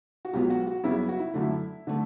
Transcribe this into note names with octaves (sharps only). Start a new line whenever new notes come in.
F#4
C#2 B2 F#3 B3 G4
F#4
F#4
F#2 C#3 G3 B3 E4
F#4
E4
F#2 D3 A3
E4
D3 A3